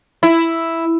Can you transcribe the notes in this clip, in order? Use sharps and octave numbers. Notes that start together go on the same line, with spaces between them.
E4